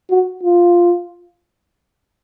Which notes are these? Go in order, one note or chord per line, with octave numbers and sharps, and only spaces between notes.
F#4
F4